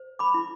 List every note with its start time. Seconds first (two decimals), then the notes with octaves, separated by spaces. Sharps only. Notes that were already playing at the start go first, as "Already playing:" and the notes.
Already playing: C5
0.19 B5 D6
0.34 E4